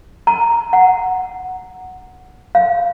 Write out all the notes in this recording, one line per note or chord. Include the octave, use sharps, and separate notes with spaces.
A#5
F#5
F5